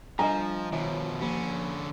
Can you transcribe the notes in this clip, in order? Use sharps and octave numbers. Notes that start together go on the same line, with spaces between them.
F3 G3 D4 D#5 G#5 A#5
B2 D#3 F3 C#5
D3 F3 A#3 C#4